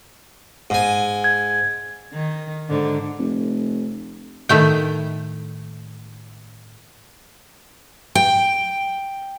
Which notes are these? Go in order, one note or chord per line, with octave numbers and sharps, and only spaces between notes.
G#2 G#5
G#6
D#3
G#2 D3
F1
A2 D#3 A3 G5
G5